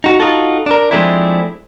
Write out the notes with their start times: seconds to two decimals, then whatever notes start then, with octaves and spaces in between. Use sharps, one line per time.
0.04 D#4 F#4
0.20 D#4 F4 F#4 A4
0.66 D4 A#4
0.91 F3 G#3 A3 C4 D4 E4